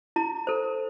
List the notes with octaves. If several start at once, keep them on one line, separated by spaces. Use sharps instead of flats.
E4 A#5
A4 C5